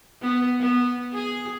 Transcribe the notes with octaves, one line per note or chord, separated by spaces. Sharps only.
B3
B3
G#4